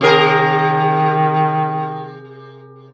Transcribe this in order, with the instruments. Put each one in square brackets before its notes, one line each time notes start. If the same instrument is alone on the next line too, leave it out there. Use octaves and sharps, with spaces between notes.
[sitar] C3 G#4 A#4 [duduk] D#3